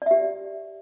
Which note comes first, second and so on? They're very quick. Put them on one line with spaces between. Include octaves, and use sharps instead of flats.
D5 E5 G4